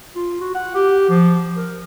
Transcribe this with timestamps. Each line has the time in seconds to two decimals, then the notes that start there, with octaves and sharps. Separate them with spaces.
0.15 F4
0.41 F#4
0.55 F#5
0.75 G4
1.10 F3
1.57 A#4